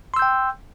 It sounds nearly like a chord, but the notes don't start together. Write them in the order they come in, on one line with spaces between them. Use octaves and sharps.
C6 E6 G6 G5